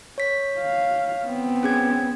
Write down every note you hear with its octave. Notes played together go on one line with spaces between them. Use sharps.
C#5 B6
F5
B3 C4
C#4 G#4 G#6